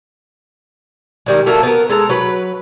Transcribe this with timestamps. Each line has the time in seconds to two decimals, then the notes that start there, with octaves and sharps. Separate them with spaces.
1.26 D#3 G3 G#3
1.46 F#3 A3 A#3 A4
1.63 B3 A#4
1.89 G#3 A4 A#5
2.09 F#3 B4